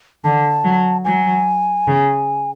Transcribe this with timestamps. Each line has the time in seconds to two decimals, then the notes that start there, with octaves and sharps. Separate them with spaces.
0.24 D3 A5
0.64 F#3
1.04 F#3 G#5
1.86 C#3